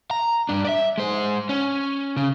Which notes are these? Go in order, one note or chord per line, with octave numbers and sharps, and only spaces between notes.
A#5
G2 D4
D5 E5
G#3 C5
C#4
C#3